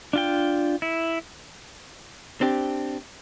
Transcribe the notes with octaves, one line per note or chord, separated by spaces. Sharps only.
D4 F4 G5
E4
C4 D4 G4